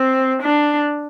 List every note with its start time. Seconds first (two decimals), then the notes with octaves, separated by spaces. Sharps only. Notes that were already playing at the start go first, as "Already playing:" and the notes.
Already playing: C4
0.42 D4